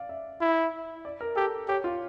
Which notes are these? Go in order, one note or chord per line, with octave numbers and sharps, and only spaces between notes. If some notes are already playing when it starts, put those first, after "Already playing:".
Already playing: D5 F5
E5
E4
D5
A#4
G4 A4
G4 C#5
F4